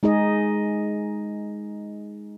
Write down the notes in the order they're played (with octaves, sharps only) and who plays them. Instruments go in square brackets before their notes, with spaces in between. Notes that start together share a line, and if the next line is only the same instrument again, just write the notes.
[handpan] G#3 D#4 G#4 D#5